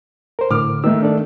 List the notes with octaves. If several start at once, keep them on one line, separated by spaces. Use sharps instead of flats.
A#4 C5
A2 D3 D6 F6
D#3 A3 E6
D4 A4 D5